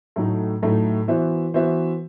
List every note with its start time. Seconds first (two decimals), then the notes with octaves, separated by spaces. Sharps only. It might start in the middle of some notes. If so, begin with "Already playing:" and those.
0.16 A2 F#3 A3 D#4
0.62 A2 F#3 A3 D#4
1.08 E3 B3 F#4 C5 E5
1.54 E3 B3 F#4 C5 E5